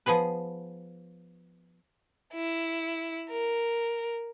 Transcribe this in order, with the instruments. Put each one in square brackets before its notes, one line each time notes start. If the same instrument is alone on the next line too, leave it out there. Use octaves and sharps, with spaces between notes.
[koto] F3 B3 G#4 B4
[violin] E4
A#4